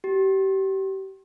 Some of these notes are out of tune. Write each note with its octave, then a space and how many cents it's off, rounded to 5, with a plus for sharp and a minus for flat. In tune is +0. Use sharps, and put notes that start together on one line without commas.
G4 -30